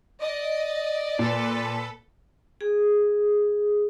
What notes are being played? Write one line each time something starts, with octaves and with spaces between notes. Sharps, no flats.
D5 D#5
A#2 A4 B4
G#4